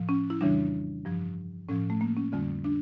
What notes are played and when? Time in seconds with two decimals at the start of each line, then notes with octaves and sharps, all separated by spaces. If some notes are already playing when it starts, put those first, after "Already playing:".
Already playing: A2 F3
0.09 C#4
0.30 E4
0.41 F2 C#3 E3 G3 D4
1.05 G2 F3
1.69 A2 F3 C#4
1.90 A3
2.01 A#3
2.17 C#4
2.32 F2 D3 G3 C#4
2.64 D4